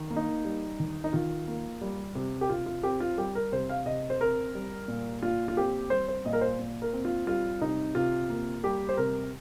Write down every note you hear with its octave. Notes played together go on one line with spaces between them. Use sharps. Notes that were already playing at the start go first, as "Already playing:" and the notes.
Already playing: D#3
A#3
D#4
G3
D#3
D#4
D#3 F4
A#3
G3
C3
G4
C3 F4
F4
C4 G4
F4
G3 G4
A#4
C3 C5
F5
C3 D#5
C5
C4 A#4
G3
A#2
A#2 F4
F4
C4 G4
G3 C5
C5
A#2 D#5
A#4
C5
A#2
A#4
C4
F4
G3 F4
C3 D#4
C3 F4
A#3
G3 G4
C5
C3 A#4